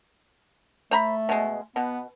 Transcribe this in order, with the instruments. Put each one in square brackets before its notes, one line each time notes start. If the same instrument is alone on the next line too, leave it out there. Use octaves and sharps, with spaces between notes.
[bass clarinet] A3 [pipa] C5 A#5 B5
[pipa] B2 G#3
[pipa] B2 [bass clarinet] B3